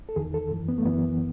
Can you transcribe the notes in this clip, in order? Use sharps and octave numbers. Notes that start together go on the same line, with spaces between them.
A4
E2 D#3 G#4
A4
F#2 E3
B3
A3
F#2 E3 B3